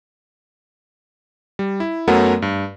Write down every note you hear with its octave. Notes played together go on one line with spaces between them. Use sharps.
G3
E4
F#2 F#3 A3 B3 A#4 F#5
G2